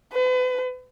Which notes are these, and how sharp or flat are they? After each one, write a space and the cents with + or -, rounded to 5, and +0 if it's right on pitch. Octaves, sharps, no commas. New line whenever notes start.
B4 +40